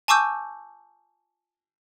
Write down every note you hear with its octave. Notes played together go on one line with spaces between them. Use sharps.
G#5 A5 C#6 D6 E6 G6